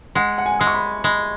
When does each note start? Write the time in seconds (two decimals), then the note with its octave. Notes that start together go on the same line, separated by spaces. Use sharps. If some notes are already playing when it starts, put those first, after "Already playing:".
0.15 G#3 F#5
0.38 F#5
0.46 G#5
0.59 G#3 D#6
0.67 C#6
0.75 B5
1.04 G#3 B5